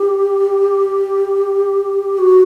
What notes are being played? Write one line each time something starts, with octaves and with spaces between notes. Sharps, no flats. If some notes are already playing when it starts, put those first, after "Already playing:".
Already playing: G4
F#4